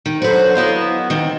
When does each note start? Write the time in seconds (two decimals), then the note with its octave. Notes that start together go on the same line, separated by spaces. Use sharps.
0.06 D#3
0.22 D3 F#3 F#4 B4 C5
0.55 F#3 B3 E4 D#5 F5
1.10 D#3 C4